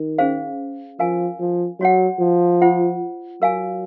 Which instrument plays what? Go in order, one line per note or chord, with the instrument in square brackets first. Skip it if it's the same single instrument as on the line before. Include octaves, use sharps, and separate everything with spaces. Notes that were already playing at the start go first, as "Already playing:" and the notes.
Already playing: [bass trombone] D#3
[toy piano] C#4 G#4 C5 F5
[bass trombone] F3 [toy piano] A#4 F5 G#5
[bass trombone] F3
[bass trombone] F#3 [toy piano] F#4 C#5 F#5
[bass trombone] F3
[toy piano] F4 C5 F#5
[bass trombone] F#3 [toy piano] A#4 F5 G#5